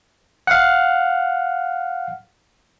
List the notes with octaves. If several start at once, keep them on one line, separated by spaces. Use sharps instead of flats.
F5 F#5